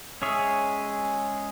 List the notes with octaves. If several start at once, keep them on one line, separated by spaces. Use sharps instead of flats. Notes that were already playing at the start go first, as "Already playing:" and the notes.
G#3 C#4 G#4 C#5 E5